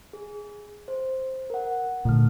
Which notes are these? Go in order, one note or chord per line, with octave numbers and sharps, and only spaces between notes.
G#4
C5
A#4 F#5
A#2 D3 A3 F6